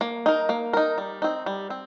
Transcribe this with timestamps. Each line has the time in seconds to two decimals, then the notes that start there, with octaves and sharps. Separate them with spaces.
0.01 A#3
0.26 D#4 A#4
0.49 A#3
0.73 D#4 A#4
0.98 G3
1.22 C4 D#4
1.46 G3
1.70 C4